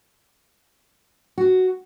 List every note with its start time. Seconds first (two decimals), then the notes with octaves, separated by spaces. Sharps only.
1.38 F#4